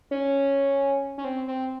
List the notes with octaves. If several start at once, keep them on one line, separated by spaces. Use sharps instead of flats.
C#4
C#4
C4
C4